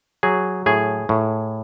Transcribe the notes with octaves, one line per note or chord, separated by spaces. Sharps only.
F#3 G#4
A2 G#4
A2